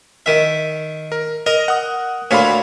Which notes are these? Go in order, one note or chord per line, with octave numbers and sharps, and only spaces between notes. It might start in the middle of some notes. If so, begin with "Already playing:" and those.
D#3 E5
A#4
A#4 D#5
F#5 D#6
D2 A#2 C#5 F5 B5